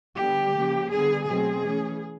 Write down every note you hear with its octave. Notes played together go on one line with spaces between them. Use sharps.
D3 G3 B3 G4
C#3 F3 A#3
D3 G3 B3 G#4
B2 F#3 A3 C4 G#4
E3 A3 C#4